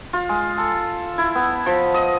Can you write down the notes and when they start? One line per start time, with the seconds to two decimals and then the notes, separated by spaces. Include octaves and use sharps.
0.13 F4
0.29 G#3
0.58 A4
1.18 E4
1.35 B3
1.66 F3
1.94 D#5